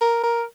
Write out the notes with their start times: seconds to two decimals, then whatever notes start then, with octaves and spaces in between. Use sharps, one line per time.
0.01 A#4
0.23 A#4